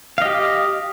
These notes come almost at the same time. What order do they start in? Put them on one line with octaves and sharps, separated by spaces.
F5 D#5 G4